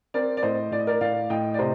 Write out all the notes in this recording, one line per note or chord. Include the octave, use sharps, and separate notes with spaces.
C4 A#4 D5
D5
A2 C5 D#5
A2 D5
D#5
A#4 D5
A2 D5 F5
A2 D#5 G5
D5
C3 C5 D#5